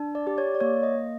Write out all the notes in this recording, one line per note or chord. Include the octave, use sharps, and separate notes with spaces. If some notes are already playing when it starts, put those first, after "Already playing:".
Already playing: D4
D5
G4
C#5
D5
A#3 C#5
D#5
A#3